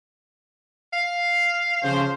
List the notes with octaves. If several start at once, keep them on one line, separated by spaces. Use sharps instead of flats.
F5
C#3 F3 C5